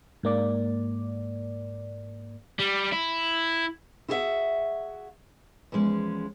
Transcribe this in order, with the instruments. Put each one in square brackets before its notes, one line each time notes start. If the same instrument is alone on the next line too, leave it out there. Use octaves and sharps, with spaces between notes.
[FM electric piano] G#2 A#3 D5
[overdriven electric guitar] G3
E4
[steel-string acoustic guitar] E4 F#4 G#4 A#4 E5 F#5
E2 F3 G#3 C#4